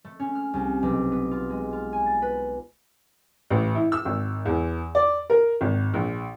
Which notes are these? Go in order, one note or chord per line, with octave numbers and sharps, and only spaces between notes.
A3
C#4
F6
C2
B1
B3
F4
G#3
F4
G#5
A6
B4
A1
E4
E6
G#1
E2
D5
A#4
G#1
A#1